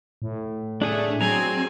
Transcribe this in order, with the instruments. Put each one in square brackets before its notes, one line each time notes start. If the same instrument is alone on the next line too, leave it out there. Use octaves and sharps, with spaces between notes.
[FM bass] A2
[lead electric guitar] A3 [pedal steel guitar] D4 G#4 G#5
[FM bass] F#3 [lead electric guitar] C4 [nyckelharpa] G#4 G#5 [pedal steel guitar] A#5